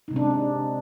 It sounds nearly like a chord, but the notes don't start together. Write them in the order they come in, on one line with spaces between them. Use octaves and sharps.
D#4 C3 G#3 D4